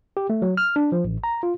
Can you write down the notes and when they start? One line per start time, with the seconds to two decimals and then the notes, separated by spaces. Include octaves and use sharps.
0.17 G4
0.30 A3
0.42 F#3
0.57 F6
0.76 D4
0.92 F3
1.04 A1
1.24 A#5
1.43 F4